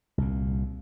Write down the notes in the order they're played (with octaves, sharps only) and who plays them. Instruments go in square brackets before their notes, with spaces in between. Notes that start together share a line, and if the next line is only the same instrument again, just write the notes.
[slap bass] C2 A#2